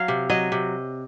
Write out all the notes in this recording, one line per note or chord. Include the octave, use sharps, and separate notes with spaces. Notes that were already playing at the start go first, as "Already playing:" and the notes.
Already playing: F#3 F5
C3
F#3 D#5
C3